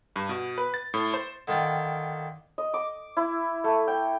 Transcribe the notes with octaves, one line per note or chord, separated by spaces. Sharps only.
G2
B2
B4
A6
A2
C5
D3 D#3 F4 G5
D#5
D6
E4
A3
G5